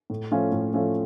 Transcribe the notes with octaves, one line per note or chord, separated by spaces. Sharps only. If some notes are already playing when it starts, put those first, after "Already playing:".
A2
F3 A3 C#4 F4
A2
F3 A3 C#4 F4